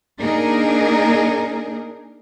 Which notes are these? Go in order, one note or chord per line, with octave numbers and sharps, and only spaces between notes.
A#3 D4 D#4 G#4 A#4